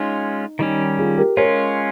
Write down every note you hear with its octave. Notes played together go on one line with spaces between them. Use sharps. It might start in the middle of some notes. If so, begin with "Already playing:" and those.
Already playing: G#3 C#4 D#4 F4
D#3 G3 C#4 D#4
F4 G#4
G4 A#4
G#3 C#4 F4 A#4 C#5